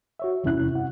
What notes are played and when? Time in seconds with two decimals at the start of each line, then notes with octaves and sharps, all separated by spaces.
0.20 F#4 C#5 E5
0.44 E2 G2 C3 C#4 E4 F#6
0.75 F#5